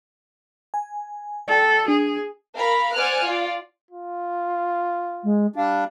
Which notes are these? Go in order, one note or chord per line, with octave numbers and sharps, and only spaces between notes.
G#5
A4 D5 G5
D4 G#4
A#4 F5 A#5 B5
C5 D5 F#5 G#5 F6 F#6
F4 D5
F4
G#3
G3 D4 F5